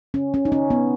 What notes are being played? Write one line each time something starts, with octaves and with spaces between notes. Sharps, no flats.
C#4
C#4
D#4
C#4
B3